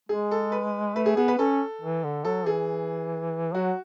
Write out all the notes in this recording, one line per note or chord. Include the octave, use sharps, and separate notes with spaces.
G#3 G#4
A4
B4
A3 B4
G#4
B3 G#4
B4
C#4 A4
E3
D3
F#3 A4
E3 G#4
F#3 F#4